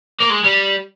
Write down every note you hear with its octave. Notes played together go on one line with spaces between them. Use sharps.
A#3
G#3
G3